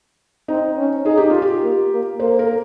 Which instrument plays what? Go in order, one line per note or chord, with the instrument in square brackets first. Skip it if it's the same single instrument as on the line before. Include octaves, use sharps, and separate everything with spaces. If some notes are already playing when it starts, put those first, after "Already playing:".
[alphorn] C4 [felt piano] D#4
[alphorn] C#4
[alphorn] D#4 [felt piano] G#4
[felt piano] G4
F4
G4
[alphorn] A#3
A#3
[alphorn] A#3 [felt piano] C5
[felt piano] A#4